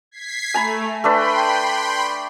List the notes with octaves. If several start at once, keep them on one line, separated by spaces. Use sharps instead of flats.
G#6 B6 C7
A3 G#5 A#5 B5
A3 D4 B4 G5 B5 C6